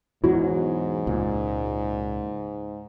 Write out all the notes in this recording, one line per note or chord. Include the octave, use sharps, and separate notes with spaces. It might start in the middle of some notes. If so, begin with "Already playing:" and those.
E2 G#2 B2 F#3 E4 F#4
C#2 A#2